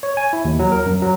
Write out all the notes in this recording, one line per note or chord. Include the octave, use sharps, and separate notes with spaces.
C#5
G#5
E4
D#2
F#3
A#4
F#2
F#3